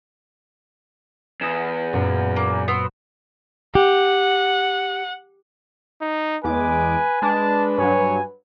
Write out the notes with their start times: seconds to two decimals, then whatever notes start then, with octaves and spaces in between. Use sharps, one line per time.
1.41 E2 D#6 B6 E7
1.93 F#2 A#2
2.36 A#3
2.68 B3 C4 C5
3.75 G4 F#5
6.01 D#4
6.44 E2 G#3 B4 G#5 D6
7.22 G#3 D4 B4 A5
7.78 G2 F#3 C#5 G#5